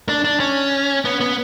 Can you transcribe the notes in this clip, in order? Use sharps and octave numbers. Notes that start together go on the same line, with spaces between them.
D4
D4
C#4
B3
B3